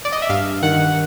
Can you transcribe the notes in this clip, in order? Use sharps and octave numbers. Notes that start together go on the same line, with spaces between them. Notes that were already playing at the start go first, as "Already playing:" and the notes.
D5
D#5
E5
G2 F5
D#3 F#5